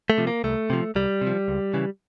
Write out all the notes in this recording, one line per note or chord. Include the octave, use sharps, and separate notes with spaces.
A3
C3 F3
A#3
C2 A3
C3 F3
C2 G3
C3
F3
C#2
C#3 E3